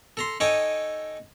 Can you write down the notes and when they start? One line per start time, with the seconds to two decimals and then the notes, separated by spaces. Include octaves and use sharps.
0.17 A4 A#5 C6
0.40 D#4 A4 C#5 G5 G#5 D#6